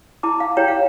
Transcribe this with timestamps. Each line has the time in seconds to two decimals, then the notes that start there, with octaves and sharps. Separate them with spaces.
0.23 E4 A5 D6
0.40 F5
0.57 E4 G4 C#5 G5 A#5
0.68 F5